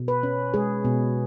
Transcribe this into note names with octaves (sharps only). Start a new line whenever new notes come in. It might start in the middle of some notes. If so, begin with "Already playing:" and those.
Already playing: B2
B4
C#4
G#3 G#4
B2